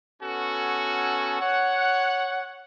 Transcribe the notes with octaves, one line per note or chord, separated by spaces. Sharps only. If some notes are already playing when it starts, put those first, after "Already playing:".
B3 C#4 F#4 A4 G#5
C#5 F#5